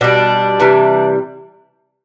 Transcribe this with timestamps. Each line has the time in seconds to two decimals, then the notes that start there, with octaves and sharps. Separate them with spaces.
0.01 B2 G3 D4
0.60 C3 E3 G3